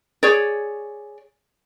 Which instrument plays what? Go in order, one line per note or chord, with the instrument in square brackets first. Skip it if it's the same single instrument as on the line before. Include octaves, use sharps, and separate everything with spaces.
[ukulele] G#4 C#5 D5